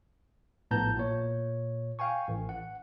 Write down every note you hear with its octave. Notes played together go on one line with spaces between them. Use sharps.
A#1 A2 B3 A5 A#5 G6
A#2 C#5
F5 G5 G#5 C#6
A1
F#5